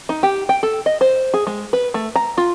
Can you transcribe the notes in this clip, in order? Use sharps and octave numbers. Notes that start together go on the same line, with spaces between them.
D#4
G4
G5
A4
D#5
C5
G#4
G#3
B4
A3
A#5
F4